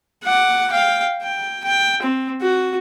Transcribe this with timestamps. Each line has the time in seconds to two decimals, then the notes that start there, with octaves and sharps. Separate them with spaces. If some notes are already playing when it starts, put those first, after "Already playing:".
0.24 F#5 D6
0.71 F5 G5
1.22 G5
1.64 G5
2.02 C4
2.41 F#4